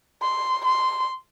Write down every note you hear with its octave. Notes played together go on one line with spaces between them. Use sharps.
C6
C6